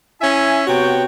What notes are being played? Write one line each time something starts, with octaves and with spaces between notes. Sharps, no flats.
C#4 E4 E5 G#5
C3 B3 F#4 C#5 G5